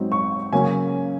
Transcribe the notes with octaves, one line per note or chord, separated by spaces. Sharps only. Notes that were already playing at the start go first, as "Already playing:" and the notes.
Already playing: G#2 F#3 C4 D#4
C#6
C#3 F#3 A#3 C#4 G#5